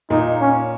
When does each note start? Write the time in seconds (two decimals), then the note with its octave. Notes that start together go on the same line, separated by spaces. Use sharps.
0.10 A#2 D#4
0.41 C#4